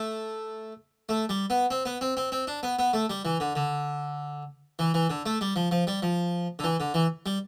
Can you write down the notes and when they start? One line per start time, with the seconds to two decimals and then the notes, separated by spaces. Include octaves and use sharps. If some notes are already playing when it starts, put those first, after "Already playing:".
Already playing: A3
1.09 A3
1.29 G3
1.50 B3
1.71 C4
1.85 B3
2.01 C4
2.17 C4
2.32 C4
2.47 D4
2.63 B3
2.79 B3
2.93 A3
3.10 G3
3.25 E3
3.40 D3
3.55 D3
4.79 E3
4.94 E3
5.10 D3
5.26 A3
5.41 G3
5.56 F3
5.71 F3
5.87 G3
6.02 F3
6.59 D3
6.64 E3
6.80 D3
6.94 E3
7.26 G3